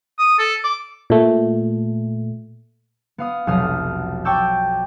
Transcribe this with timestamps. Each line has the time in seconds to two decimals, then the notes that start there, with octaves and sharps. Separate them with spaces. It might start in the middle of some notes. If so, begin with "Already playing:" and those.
0.18 D#6
0.39 A4
0.64 D6
1.10 A#2 A3
3.18 B3 F5 D#6
3.47 F1 B1 F#3 D#6 F6
4.25 G5 A5 C#6 D6 E6 G6